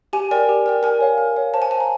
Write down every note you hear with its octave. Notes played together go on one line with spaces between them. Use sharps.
G4 G#5
A#4 D5 G5
G4
A#4 D5 G5
A#4 G#5
C#5 F5
A#4
C#5 F5
C5 A5
G#5
F5 A5
A#5